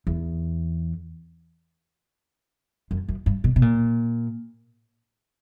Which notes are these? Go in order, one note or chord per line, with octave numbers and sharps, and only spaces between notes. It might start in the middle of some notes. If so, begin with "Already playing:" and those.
E2
F#2
F#2
G2
B2
B2
A#2